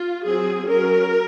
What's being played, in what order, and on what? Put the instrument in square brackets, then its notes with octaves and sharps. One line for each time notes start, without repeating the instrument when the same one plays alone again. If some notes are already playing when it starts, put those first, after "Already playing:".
Already playing: [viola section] F4
F#3 C4 G#4
F#3 C#4 A#4